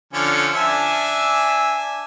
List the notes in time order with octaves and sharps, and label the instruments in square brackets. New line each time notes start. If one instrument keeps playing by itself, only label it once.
[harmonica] D3 F3 C#4
D4 E5 G#5